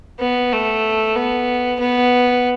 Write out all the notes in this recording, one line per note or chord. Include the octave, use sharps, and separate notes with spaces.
B3
A3
B3
B3